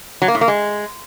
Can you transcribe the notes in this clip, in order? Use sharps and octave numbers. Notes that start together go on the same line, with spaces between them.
F#3
A#3
A2
A#3
G#3